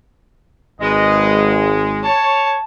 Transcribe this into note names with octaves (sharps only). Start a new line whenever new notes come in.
G#1 G#3 B4 D#5
C#5 A5